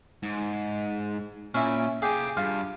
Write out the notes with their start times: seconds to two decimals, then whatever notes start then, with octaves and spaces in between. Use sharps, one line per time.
0.23 G#2
1.55 A#2 C#4 E4
2.02 G4 G#4 F5 G#5
2.37 G2 F4